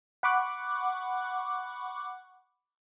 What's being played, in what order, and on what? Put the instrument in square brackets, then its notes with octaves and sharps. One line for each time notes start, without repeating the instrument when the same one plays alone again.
[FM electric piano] F#5 B5 C#6 D6 F#6